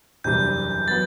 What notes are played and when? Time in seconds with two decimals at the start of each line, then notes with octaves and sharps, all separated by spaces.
0.24 F#1 E2 C3 G3 D4 G6
0.88 F#3 B3 A6